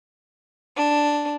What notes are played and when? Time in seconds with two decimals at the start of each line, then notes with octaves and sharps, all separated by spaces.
0.78 D4